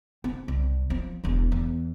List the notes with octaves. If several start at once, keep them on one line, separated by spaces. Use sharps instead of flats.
C4
C2
F3 C4
E1 E2
E2